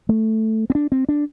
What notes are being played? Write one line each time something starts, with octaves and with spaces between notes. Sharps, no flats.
A3
C4
D4
C4
D4